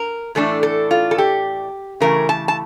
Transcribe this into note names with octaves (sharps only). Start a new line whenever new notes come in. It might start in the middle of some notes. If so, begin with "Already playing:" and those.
Already playing: A#4
A2 E3 A3 D4 A4
A4
F4
A4
G4
C#3 E3 A3 A#4
A5
A5